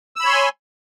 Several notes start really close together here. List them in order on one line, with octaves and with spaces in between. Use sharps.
E6 B5 C#5 C6 G#5